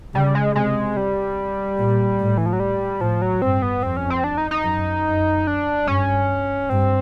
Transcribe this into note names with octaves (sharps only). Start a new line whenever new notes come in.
C#3 G3
G#3
C3 G#3
G3
A#2
A2
E3
F3
F#3
G3
A2 F3
F#3
G2 C4
B3
F2 C4
C#4
C4
D4
D#4
D#4
F#2
F#2
D4
G2 C#4
G2 C4